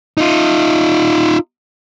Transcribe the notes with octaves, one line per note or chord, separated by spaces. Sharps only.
D#4 F4